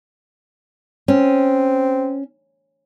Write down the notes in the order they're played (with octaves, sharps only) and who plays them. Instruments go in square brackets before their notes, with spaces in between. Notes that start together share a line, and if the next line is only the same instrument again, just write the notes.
[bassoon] C4 [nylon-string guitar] C#4